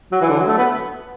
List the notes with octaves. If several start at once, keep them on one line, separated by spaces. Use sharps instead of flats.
F#3
E3
D3
F#3
A3
B3